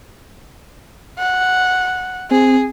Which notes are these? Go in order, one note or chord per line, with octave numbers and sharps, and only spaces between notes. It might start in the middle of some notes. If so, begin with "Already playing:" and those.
F#5
C4 G#4